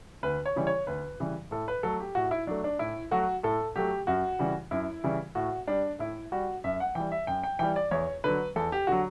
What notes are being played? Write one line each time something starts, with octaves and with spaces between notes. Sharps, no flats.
D2 B4
C#5
C#3 E3 G3
C#5
D2 B4
C#3 E3 G3
A2 A4
B4
F#3 A3 A4
G4
A2 F#4
E4
F#3 A3 D4
D4
A2 E4
F#3 A3 F#4
A2 A4
F#3 A3 G4
F#2 F#4
C#3 E3 G3
F#2 E4
C#3 E3 G3
A2 F#4
G3 D4
A2 E4
G3 F#4
F#2 E5
F#5
E3 G3 G5
E5
F#2 G5
G5
E3 G3 G5
D5
E2 C#5
D3 F#3 B4
E2 A4
G4
D3 F#3 F#4